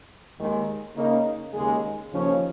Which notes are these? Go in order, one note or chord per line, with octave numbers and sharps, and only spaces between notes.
D#2 D#3 G#3
C#3 A#3 D#4
D#2 C#3 G#3
D#2 C#3 F3 C#4